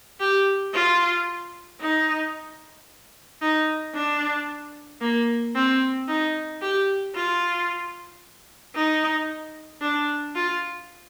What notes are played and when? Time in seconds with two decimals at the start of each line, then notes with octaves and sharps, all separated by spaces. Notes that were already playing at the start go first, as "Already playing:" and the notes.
0.20 G4
0.74 F4
1.81 D#4
3.42 D#4
3.95 D4
5.01 A#3
5.55 C4
6.08 D#4
6.62 G4
7.15 F4
8.75 D#4
9.82 D4
10.36 F4